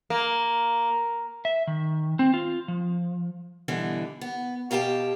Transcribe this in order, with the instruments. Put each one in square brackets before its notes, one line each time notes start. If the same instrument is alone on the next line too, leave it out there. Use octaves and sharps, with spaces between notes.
[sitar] A#3
[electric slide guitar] E5
D#3
C4
F4
F3
[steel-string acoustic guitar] B2 D3 E3 G3
B3
B2 G4 F5 G5 A5